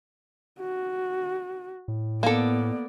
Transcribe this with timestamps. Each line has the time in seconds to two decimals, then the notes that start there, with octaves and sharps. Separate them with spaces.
0.60 F#4
1.88 A2
2.23 A#3 B3 A4 D5